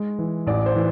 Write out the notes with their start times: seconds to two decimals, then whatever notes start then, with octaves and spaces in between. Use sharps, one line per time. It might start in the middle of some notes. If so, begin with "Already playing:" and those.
Already playing: G#3
0.19 E3
0.47 A1 D5
0.66 C5
0.75 E3